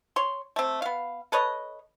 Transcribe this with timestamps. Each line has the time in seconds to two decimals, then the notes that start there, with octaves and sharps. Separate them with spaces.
0.16 C#5 C6
0.56 A3 C4
0.82 B3 F5
1.32 A4 B4 C#5 D#5